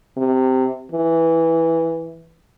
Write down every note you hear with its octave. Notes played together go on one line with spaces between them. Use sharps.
C3
E3